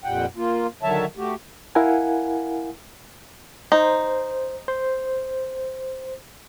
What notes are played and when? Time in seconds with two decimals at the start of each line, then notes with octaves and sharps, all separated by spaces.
0.04 F2 A#2 G3 F#5 G5
0.36 A#3 F4
0.83 D3 D#3 F#3 C#5 E5 A5
1.17 A3 F#4 G4
1.75 E4 A#4 F5 F#5 G#5
3.72 D#4 C5
4.68 C5